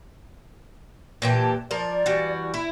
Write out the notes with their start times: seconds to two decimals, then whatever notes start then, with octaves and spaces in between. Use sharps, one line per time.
1.22 A#2 E3 G4 A5
1.71 F3 A#4 D5
2.06 E3 G3 F#4
2.54 E4